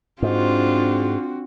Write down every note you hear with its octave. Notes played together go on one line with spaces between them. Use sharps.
G#2 C4 D4 F4 F#4